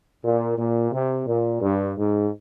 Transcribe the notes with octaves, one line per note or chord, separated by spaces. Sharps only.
A#2
A#2
C3
A#2
G2
G#2